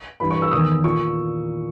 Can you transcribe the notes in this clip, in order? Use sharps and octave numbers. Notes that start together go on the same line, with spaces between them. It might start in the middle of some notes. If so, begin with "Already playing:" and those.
G2 E3 B5
C#6
E6
E2 D#3 D#6
A#2 C#6